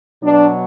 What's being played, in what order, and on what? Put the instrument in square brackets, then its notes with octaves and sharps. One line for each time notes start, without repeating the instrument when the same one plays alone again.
[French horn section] B2 F#3 D4